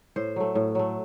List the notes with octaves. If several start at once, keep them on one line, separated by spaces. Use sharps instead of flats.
A2 C5
F#3 A3
A2
F#3 A3